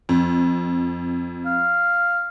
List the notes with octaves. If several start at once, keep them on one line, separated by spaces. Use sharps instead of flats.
F2
F5